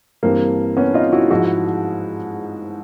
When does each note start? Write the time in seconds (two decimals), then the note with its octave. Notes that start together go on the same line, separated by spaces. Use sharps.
0.23 G2 E3 G3 A#3 C4
0.77 B3 C#4
0.94 D#4 F4
1.12 E4 F#4
1.30 G#2 F3 G#3 E4 F#4